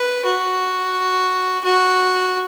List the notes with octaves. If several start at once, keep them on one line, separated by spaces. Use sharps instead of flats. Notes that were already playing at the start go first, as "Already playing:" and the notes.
Already playing: B4
F#4
F#4